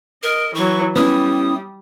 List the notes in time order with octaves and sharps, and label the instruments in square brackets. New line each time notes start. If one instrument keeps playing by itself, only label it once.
[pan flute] A#4 [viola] D#5
[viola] E3 F#3 [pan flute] C#6
[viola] G3 [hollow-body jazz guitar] B3 C#4 E4 [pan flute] D#6